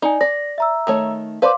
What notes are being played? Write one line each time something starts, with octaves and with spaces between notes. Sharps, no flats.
D#4 D5 G#5
D5 A#6
E5 A#5 E6
D#3 A3 C#5
B4 C5 D5 F5 C6 D6